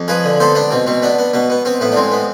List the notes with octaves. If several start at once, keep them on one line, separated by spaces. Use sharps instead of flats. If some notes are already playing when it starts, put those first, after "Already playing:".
Already playing: F2
F3 G#4 B4
D3
B3 A4 C5
B3 D4
B2 C4
B2 C4
B3 D4
B3
B2 B3
B3
B3 C4
A2 B3
D4
G#3 C4
B3